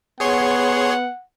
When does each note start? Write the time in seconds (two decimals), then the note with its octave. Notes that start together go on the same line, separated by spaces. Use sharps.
0.20 B3 G#4 C#5 F#5 C6